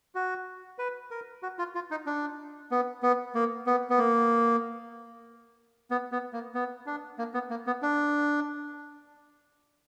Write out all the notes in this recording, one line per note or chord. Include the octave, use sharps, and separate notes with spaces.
F#4
B4
A#4
F#4
F4
F4
D#4
D4
B3
B3
A#3
B3
B3
A#3
B3
B3
A#3
B3
D4
A#3
B3
A#3
B3
D4